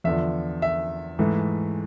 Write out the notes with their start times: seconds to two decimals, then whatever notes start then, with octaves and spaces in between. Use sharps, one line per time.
0.04 E2 D3 F3 E5
0.62 E5
1.19 G#2 E3 A3